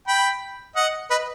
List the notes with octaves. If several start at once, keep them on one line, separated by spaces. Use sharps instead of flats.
G5 B5
D#5 F#5
B4 D#5